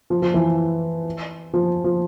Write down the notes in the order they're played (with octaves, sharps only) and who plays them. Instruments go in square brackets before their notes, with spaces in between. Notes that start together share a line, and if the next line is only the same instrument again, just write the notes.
[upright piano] F3
F3
E3
F3
F3